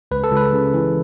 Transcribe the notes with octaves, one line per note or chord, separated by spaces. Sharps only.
C#2 B4
A4
C#2 B4
C#3
E3